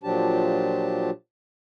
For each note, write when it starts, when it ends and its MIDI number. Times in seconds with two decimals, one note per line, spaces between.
0.03 1.10 46
0.03 1.10 53
0.03 1.10 54
0.03 1.10 62
0.03 1.10 67
0.03 1.10 81